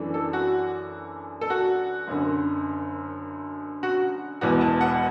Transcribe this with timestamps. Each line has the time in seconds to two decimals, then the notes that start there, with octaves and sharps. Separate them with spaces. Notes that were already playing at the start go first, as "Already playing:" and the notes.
Already playing: F#2 E3 A3 D4
0.14 A4
0.33 F#4
1.41 A4
1.50 F#4
2.07 F#1 F#2 D3
3.83 F#4
4.41 E1 E2 B2 F#4
4.61 A5
4.81 F#5